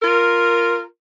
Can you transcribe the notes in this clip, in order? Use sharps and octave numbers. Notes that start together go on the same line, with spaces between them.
F4 A#4